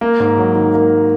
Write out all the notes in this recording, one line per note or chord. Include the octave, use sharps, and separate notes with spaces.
A#3 A#4
G#2
F#3
D#3
A#3